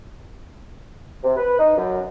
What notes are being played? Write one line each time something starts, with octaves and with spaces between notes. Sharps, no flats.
C3
B4
D#4
F#2